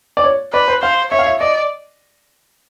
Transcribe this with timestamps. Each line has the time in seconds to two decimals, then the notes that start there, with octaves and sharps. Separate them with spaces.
0.17 D5
0.24 C#5
0.53 B4 D5
0.68 C5
0.82 C5 F5
1.12 C#5 E5
1.19 F5
1.26 E5
1.40 D5 D#5